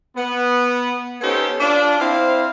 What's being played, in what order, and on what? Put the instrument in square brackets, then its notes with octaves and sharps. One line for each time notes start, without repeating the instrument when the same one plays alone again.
[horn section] B3
B3 C#4 D#4 G4 A4 C5
D4 F4 D5
C4 E4 C5 F5